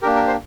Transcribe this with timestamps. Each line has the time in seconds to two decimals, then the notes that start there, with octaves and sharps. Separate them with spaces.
0.02 G4 A#4
0.05 A#3 D4
0.15 A#4
0.27 C5